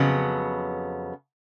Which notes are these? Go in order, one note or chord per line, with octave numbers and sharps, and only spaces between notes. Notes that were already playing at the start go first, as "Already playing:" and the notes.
Already playing: F2 C#3 F#3 B3